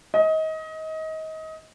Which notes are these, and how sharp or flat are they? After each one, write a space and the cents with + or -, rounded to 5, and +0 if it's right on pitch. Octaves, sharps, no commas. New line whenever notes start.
D#5 +25